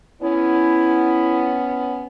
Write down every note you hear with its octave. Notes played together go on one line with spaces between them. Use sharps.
B3 C#4 E4